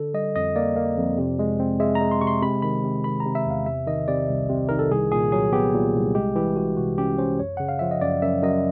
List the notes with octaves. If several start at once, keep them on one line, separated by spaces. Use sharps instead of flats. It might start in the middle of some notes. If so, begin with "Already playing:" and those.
Already playing: D3 A4
G3 D#5
F2 D#5
A#3 D5
A#3
F2
C3
G#3
C4
G#3 E5
A#5
G#3
C6
C3 C#6
C6
C3 B5
D#3 B5
C3
D#3 B5
A#5
C3
E5
E2 F5
C3 E5
D#3 D#5
C3 D5
C2
C3
D#3 A#4
A4
C2 G#4
A#2 G#4
F#3 G#4
B3 G4
A#2
C2
G#3 G4
E3 G4
E3 F#4
C3 F#4
C#4 G4
C#4 C5
F#2 C#5
C#3 F#5
F5
F3 E5
D#5
F#2 D5
F#2 E5
F#2 D#5